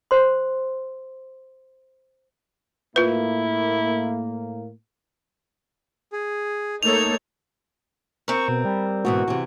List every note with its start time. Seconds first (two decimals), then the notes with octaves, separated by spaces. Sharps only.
0.11 C5 C6
2.96 A2 A#3 E4 F4 B4
6.13 G#4
6.83 A3 A#3 D#4 A4 C#5 F7
8.28 C4 A#4 C#6
8.48 B2
8.65 G3
9.05 G#2 B2 E3 F#4
9.28 C3 E3